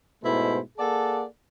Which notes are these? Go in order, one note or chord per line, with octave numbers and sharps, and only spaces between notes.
G#2 B2 A3 E4 B4 C5
A#3 G#4 A4 D5 F#5 A5